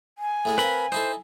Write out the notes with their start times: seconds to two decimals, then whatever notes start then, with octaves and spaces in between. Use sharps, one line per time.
0.18 G#5
0.45 A2 G#3 A3
0.58 C4 A#4 B4 F5 B5
0.92 D#4 E4 A4 C5